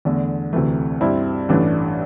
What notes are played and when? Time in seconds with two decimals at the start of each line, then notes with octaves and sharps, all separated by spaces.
0.05 E2 D3 A3
0.53 D2 C3 E3 A3
1.01 G2 G3 C4 E4
1.49 A1 G2 E3 A3 D4